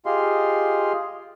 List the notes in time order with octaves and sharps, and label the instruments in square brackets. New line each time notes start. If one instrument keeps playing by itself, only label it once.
[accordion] F4 G4 G#4 D#5 F5 C6